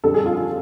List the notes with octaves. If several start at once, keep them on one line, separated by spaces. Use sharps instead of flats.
F2 D3 G3 A4
G#4
F4
F4